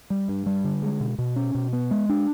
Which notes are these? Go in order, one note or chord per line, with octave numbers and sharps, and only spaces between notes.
G3
G2
G3
D3
G#3
B2
B2
C#4
B2
B3
G#3
D4